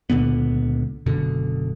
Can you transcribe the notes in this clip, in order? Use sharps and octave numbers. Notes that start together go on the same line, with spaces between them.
C#2 A#2 D3 B3
F#1 B2 D3